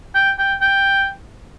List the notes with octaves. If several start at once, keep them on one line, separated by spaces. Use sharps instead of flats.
G5
G5
G5